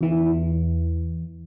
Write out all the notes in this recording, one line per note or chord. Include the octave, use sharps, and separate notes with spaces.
E2 E3